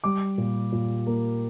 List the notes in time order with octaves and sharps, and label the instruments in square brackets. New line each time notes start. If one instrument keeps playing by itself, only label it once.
[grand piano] G3 D6
A#2
A#2
A#3